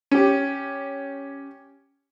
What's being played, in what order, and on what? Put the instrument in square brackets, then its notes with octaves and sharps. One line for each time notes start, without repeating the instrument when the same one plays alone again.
[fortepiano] C#4 G4